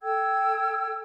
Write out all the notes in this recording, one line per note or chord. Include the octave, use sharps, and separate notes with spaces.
A4 G5 E6 G#6